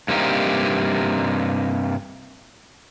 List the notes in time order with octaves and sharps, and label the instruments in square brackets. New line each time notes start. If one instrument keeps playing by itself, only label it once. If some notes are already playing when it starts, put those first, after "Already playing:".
[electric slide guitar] G2 C3 A#3 D#4 G4